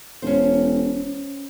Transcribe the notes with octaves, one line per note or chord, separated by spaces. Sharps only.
E1 C#4 C5